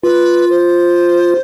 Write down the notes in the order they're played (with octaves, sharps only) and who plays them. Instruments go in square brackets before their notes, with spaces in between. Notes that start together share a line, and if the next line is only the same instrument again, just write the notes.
[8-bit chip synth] F4 [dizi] B4
[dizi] C5